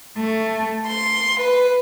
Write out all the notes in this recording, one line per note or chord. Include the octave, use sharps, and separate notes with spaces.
A3
C6
B4